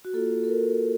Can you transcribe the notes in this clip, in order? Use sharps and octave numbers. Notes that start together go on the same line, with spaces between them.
F#4
A#3 F4 A4
A4
A#4